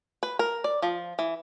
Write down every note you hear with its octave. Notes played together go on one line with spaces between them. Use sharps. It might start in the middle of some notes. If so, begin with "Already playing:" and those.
B4
A#4
D5
F3
E3